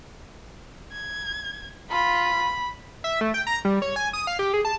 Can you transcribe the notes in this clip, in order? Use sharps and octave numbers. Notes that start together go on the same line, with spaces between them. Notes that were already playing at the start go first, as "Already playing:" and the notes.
G#6
F4 B5
E5
A3
G5
A#5
G3
C#5
G#5
D#6
F5
G4
G#4
A5